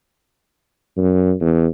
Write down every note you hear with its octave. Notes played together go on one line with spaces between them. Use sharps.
F#2
E2